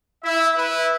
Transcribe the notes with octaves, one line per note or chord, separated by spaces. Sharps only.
E4 E5
E4 B4